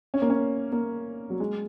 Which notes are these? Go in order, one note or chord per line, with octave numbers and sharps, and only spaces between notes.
C#4
A#3
C#4
A#3
F#3
G#3